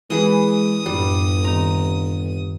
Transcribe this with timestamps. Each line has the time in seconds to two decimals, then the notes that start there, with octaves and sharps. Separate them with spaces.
0.10 E3 G#3 G#4 B4 D#6
0.86 G1 F#2 A2 G3
1.44 D#3 C4 A#5